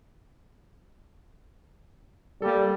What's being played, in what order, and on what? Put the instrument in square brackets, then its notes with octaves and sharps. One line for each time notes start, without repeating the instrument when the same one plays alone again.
[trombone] G3 [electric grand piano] A#3 A4